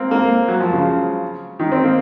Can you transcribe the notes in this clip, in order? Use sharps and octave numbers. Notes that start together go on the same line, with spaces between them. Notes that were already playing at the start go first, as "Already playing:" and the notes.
Already playing: A#3 C4
A#3
F#3
F3
C#3
D#3
C4
A#3